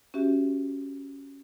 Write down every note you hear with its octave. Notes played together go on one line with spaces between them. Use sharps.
C#4 F#4 G4 E5